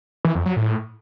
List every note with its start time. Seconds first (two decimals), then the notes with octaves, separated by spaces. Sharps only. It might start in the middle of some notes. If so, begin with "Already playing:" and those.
0.25 E3
0.35 F2
0.46 F#3
0.56 A2